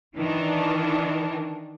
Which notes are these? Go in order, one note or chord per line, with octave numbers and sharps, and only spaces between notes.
D#3 E3 D4